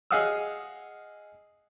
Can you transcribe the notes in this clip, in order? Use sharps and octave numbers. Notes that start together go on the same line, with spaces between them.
G#4 D#5 F5 F#5 D#6 E6